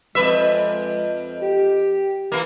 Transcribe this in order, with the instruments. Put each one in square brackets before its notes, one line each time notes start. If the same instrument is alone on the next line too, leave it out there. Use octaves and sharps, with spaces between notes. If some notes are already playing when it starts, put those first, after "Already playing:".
[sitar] F2 B4 E5 [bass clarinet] G#3
[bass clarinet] G4
[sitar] E3 A#3